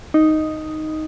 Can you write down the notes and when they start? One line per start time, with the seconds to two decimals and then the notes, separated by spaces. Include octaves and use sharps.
0.14 D#4